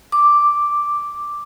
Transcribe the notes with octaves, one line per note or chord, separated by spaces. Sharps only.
D6